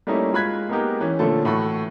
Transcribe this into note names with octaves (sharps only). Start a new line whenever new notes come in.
G3 A3 A#3 C#4 D#4 E4
G#3 F4 B5 F#6 G#6 B6
G#3 A#3 B3 D#4 G4 A#4
E3 C#4
A#2 D3 F3 A3 C#4 A4
A2 E3 F#4 A4 B5 C#6